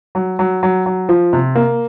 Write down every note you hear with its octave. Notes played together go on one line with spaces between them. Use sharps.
F#3
F#3
F#3
F#3
F3
C3
A#3